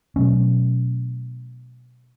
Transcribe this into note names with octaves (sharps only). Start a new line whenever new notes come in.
B2 F#3 A3 C#4